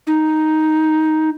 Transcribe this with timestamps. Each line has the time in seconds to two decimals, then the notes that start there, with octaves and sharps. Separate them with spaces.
0.07 D#4